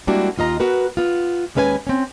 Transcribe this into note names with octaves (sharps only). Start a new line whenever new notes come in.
G3 G#3 A#3 D4 E4 F#4
D#2 F4 D#5 A#5
B3 F#4 A#4 B4
B3 F4
D#2 G#3 C#4 B4 F5 G#5
C4 C#4